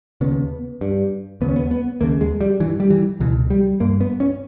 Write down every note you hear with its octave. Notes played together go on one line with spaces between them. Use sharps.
D#2 C#3 B3
G2
D#2 C#3 B3
C#4
B3
B3
D#2 C#3 A#3
G#3
G3
G2 E3
G3
E3
C#2 B2 E3
G3
G2 A#3
B3
C#4